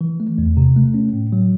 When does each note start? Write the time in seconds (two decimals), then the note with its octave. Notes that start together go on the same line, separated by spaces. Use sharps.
0.01 E3
0.20 A3
0.38 E2
0.57 C3
0.76 A3
0.94 C#4
1.13 A2
1.33 F#3